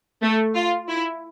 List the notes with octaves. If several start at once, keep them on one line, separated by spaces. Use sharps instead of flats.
A3
F4
E4